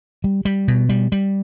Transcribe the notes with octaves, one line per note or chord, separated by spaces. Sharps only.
G3
G3
B2
G3
G3